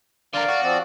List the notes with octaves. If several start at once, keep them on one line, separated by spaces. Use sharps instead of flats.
D3 A#4 D5 F5 D6
F#4
F3 C4 D5